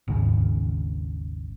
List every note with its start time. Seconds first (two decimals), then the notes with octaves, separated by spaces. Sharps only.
0.08 G#1 D#2 G#2 C#3